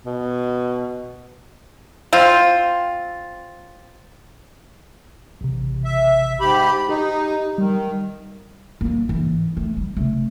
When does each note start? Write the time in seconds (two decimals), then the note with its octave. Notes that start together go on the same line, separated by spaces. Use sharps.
0.06 B2
2.13 C4 F4
5.41 A1 C3
5.85 E5
6.40 G#2 G4 B5
6.89 D#4 G4
7.58 D#3 G3
8.81 G3 A#3
9.09 G#2 E3
9.57 A3
9.77 G3
9.97 C3 A3